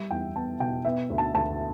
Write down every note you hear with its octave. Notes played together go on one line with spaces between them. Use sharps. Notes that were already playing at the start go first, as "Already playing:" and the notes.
Already playing: G3 E5
E2 G5
B3 A5
B2 G5
B3 E5
D2
A5
D2 A5